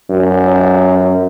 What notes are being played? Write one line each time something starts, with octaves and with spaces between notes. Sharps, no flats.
F#2